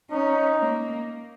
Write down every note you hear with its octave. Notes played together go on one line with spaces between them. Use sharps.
C#4 D#4
A#3